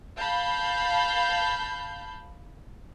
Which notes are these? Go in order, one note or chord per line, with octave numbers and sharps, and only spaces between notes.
F5 A5 B5 G6